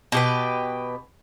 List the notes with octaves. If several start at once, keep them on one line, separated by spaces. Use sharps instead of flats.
B2 G4 B4